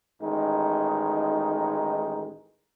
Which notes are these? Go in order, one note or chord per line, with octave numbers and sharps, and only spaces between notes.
A1 D#3 G#3 D#4